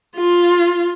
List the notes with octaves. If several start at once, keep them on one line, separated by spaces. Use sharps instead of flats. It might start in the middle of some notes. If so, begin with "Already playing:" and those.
F4